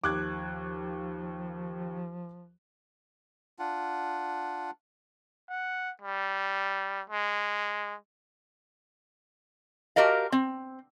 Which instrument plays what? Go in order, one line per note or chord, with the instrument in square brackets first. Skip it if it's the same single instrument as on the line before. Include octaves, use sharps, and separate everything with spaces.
[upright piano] D#2 [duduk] F3 [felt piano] D6 F#6 G#6
[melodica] D4 F4 F#5
[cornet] F#5
G3
G#3
[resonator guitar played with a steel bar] F#4 G4 A#4 D#5 F5
C4